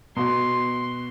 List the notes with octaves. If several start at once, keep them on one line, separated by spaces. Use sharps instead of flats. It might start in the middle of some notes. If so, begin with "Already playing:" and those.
B2 F#4 C6